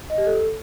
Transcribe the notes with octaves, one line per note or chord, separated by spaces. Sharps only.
D#5
G4
A4